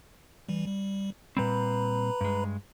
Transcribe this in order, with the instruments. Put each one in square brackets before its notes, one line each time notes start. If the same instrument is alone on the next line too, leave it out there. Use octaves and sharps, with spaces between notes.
[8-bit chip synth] E3 G3
G3
[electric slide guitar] A#2 G3 C4 [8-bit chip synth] B4 A#5 B5
[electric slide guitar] G2 G#3